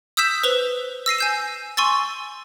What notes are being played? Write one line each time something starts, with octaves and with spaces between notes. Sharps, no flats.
D#6 E6 G6 B6 E7
B4 C5 F7 G7
E6 A#6 C7 D#7
G#5 G6 E7
G#5 C6 C#6 E6 A6